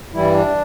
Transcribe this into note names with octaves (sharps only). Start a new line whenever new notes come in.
G2 E3 G3 E4
D4